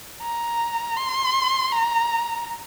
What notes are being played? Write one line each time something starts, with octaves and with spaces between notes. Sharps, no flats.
A#5
C6
A#5